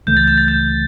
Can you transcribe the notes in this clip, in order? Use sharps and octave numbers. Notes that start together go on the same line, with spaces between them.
C#2 C#3 E3 A3 G6
A6
G6
A6
G6